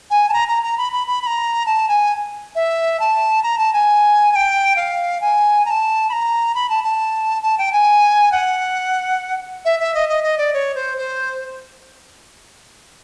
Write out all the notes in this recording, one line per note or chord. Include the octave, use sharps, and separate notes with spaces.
G#5
A5
A#5
A#5
A#5
B5
B5
B5
B5
A#5
A5
G#5
E5
A5
A#5
A5
G#5
G#5
G5
F5
G#5
A#5
A5
B5
A#5
B5
A5
A5
A5
G5
G#5
F#5
E5
E5
D#5
D#5
D#5
D5
C#5
C5
C5